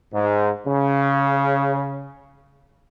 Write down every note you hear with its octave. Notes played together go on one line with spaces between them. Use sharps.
G#2
C#3